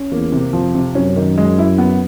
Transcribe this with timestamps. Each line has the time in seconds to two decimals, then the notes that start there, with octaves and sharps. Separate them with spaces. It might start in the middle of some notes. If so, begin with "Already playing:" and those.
Already playing: C#4
0.12 E2 A#3
0.32 C3
0.53 F2 F3
0.75 C3
0.95 F#2 C#4
1.16 D#3
1.38 G#3
1.58 E4
1.78 B3